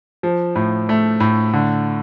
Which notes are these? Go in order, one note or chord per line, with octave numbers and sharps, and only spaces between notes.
F3
A2
A3
A2
D3